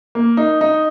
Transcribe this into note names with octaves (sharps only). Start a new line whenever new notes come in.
A#3
D#4
D#4